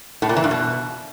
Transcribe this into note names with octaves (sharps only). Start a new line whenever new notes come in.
A2
A#2
E3
G2
B2